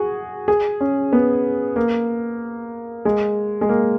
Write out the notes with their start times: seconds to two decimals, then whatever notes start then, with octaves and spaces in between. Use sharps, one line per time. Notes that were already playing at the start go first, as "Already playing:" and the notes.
Already playing: F#4 G#4
0.48 G#4
0.81 C#4
1.13 B3
1.76 A#3
3.05 G#3
3.61 G#3
3.69 A#3